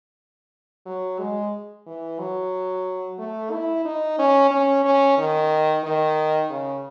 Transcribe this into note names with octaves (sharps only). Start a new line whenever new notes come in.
F#3
G#3
E3
F#3
A3
E4
D#4
C#4
C#4
C#4
D#3
D#3
C#3